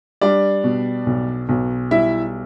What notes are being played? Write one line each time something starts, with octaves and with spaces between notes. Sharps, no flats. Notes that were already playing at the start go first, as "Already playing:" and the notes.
G3 D4 D5
B2
B1
B1
G3 E4 E5